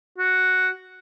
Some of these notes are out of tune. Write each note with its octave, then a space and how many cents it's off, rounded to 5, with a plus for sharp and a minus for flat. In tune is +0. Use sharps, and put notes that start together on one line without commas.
F#4 +0